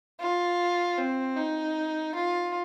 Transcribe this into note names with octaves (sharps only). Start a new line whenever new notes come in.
F4
C4
D#4
F4